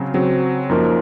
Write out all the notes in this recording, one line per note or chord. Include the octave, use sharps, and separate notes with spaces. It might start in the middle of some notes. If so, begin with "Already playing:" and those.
Already playing: C#3 F#3 C4
C#3 F#3 C4
F#2 F3 A#3 D#4 A#4